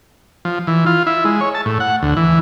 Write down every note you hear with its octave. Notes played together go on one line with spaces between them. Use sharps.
F3
E3
F4
E4
G#3
C#5
A5
A2
F#5
D2
E3